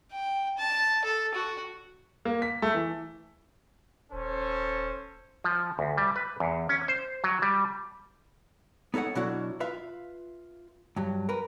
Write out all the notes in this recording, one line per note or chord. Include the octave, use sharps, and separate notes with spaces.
G5
A5
A4
F#4
A#3
B6
A3
E3
D#1 C#4 A4 C5
F3
D2
G3
B4
E2
C#4
C5
F#3
G3
B3 D#4 A4 C#5 F#5
B2 F#3 D4 E4 F#4
F4 B4 E5 F5
G2 F#3
A#4 B4